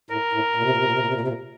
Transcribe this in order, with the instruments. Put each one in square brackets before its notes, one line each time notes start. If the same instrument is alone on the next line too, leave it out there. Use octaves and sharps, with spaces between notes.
[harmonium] A2 [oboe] A#4
[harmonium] A2
A#2
C3
A#2
C3
A#2
C3
A#2
C3
A#2
C3
A#2